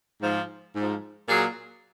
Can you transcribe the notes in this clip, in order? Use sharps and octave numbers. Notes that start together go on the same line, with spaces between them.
G#2 F3
G#2 F3
A#2 F#3 G#4